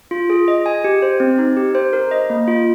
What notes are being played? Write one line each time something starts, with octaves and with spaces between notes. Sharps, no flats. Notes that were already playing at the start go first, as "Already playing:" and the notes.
F4
G#4
D#5
G#5
G4
C5
C4
D#4
G4
C5
A#4
D#5
A#3
F4